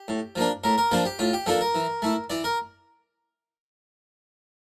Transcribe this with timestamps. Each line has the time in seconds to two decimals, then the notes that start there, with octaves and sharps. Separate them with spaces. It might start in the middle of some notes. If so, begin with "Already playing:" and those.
Already playing: G4
0.08 A2
0.36 F3 A#3 D4
0.64 A2 A#4
0.78 A#4
0.91 F3 A#3 D4 C5
1.05 G4
1.19 A2 F4
1.33 G4
1.46 F3 A#3 D4 A4
1.61 A#4
1.75 E3
2.02 A3 E4
2.30 E3 D5
2.44 A#4